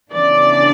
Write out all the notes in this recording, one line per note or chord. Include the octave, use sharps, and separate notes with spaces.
C#3 E3 B3 D4 D5